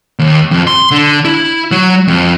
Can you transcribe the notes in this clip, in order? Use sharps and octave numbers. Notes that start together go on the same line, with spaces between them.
D#2
F2
C6
D3
E4
F#3
F2